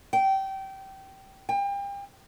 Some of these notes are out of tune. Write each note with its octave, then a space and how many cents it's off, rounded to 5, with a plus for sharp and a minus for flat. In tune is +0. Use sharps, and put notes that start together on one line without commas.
G5 -20
G5 +35